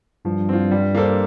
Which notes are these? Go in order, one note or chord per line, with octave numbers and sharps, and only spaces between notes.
G2 F3
C4 F4
G3
A#3 D4 A4 C5